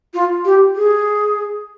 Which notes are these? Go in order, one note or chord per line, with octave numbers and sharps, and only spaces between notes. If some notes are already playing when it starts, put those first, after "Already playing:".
F4
G4
G#4